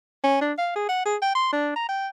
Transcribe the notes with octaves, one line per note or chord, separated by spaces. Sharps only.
C#4
D4
F5
G#4
F#5
G#4
G5
C6
D4
A#5
G5